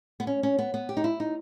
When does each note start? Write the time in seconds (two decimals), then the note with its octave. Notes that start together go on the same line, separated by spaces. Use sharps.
0.20 B3
0.27 C#4
0.43 C#4
0.59 B3
0.74 B3
0.89 G4
0.97 D#4
1.04 E4
1.20 D#4